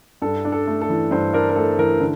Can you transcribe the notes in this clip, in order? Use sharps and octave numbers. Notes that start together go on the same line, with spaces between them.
G2 A4
D4
A4
A3
A4
E3
G2 C5
D4 A#4
A#4
A3 A4
E3 A#4
D3